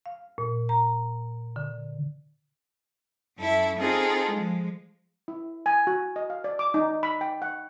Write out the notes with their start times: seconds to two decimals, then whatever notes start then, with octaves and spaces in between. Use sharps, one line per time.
0.06 F5
0.38 A#2
0.69 A#5
1.56 D3
3.38 F#2 E4 A4 E5
3.78 C4 D#4 F4 G#4 A4
4.30 F3 G#3
5.28 E4
5.66 G#5
5.87 F#4
6.16 D#5
6.30 F5
6.44 D5
6.59 D6
6.74 D#4
7.03 B5
7.21 G5
7.42 F#5